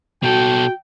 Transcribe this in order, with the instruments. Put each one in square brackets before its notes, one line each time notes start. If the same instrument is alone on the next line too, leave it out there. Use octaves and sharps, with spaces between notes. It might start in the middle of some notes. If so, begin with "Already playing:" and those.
[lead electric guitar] B2 A4 [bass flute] F#4 [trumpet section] G5